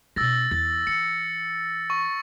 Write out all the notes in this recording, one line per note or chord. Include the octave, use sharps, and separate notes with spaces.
B2 C#4 E6 A6 A#6
E2 A6
E3 C#7
C#6